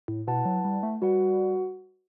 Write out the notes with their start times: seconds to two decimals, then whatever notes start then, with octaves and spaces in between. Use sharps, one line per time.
0.08 A2
0.27 B2 E4 B4 F#5 A5
0.45 F#3
0.65 G3
0.83 A3
1.02 G3 F#4 B4 F#5